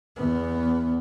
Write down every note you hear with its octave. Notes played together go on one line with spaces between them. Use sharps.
E2 B3